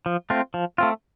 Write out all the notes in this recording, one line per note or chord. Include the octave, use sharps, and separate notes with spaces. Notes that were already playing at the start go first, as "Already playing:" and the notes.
F3
A3 C4 F4
F3
A3 C4 F4